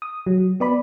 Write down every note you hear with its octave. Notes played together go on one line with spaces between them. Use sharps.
D#6
F#3
B3 D5 B5